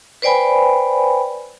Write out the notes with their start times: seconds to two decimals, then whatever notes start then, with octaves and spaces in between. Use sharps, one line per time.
0.22 B4 C5 D5 G5 G#5 B5